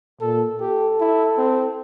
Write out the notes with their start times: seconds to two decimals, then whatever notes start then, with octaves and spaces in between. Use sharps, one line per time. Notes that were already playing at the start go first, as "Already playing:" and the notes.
0.21 A#2 A4
0.60 G4 A4
1.00 E4
1.38 C4